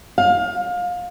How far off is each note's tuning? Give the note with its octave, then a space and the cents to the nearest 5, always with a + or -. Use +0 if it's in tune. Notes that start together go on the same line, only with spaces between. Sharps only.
F5 +25